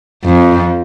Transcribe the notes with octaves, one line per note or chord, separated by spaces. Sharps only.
F2